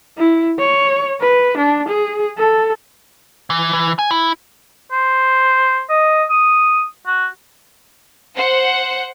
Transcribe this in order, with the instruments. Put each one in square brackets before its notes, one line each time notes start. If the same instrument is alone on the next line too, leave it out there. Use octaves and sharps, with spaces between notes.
[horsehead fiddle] E4
C#5
B4
D4
G#4
A4
[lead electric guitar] E3
E3
G#5
E4
[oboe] C5
D#5
D#6
F#4
[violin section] C5 F#5